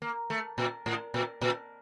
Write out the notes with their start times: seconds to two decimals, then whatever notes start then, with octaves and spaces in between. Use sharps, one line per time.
0.02 A#3
0.30 A3
0.58 A#2
0.86 A2
1.14 A#2
1.41 A#2